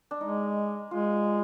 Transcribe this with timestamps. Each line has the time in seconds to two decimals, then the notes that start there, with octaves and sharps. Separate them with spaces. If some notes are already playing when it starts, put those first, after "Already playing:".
0.11 D4
0.20 G#3 D#4
0.91 G#3 F4